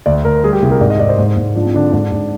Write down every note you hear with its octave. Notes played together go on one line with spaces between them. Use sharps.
D2 D5
D2 A#4
G3 G#4
G4
C2 G#4
A#4
G#2 D5
D#5
G#2 D5
C5
G#2
G#2
F3 D4
C4
D3 D4
G#2 D4
G#2